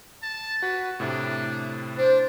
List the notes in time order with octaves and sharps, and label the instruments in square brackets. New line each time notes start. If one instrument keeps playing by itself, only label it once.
[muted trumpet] A5
[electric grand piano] F#4 [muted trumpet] B4
[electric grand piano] A2 C3 E4 [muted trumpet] D4
[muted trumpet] D4 [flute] C5